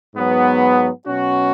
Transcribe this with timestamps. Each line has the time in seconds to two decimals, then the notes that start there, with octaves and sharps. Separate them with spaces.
0.15 G#2 F#3 B3
1.07 B2 F#3 C#4 F#4